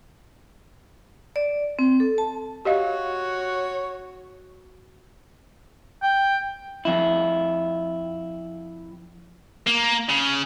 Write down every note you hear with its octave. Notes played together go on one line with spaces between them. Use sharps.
D5
C4
A4
A5
F#4 G4 C#5 D#5 F5
G5
F2 E4
A#3
C#3